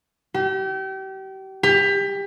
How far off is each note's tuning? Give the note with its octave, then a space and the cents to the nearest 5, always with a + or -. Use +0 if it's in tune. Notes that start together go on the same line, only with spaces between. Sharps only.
G4 -35
G4 +25